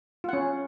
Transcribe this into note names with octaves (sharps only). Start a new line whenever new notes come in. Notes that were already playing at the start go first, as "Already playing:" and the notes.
C#4 F4 F#5